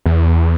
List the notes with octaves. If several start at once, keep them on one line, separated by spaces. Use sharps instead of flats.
E2